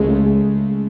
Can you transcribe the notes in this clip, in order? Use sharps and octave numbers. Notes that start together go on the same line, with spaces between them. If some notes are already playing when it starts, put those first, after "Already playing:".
Already playing: C#2 C#3 G#3 A3